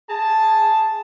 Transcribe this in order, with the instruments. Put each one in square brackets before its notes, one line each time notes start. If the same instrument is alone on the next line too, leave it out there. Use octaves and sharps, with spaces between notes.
[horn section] G#4 A5